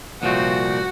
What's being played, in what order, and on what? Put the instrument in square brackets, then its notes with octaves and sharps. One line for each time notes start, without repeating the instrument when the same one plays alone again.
[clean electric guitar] C2 A#2 F3 A3 C4 [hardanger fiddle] F#4